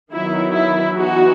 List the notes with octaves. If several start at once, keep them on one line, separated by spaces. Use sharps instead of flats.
D#3 F#3 B3 D#4 E4
E4
E3 B3 D#4 F#4